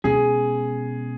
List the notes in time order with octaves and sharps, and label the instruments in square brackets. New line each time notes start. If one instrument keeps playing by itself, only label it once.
[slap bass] B2 G#3 C#4 [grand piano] G#4